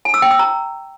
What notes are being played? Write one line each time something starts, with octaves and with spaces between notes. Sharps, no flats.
G#5
E6
G5
E6
A#5